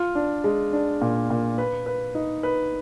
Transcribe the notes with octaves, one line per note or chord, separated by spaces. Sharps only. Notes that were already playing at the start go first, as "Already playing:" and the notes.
Already playing: F4
D4
G#3
D4
A#2
A#2
B4
B4
D#4
B4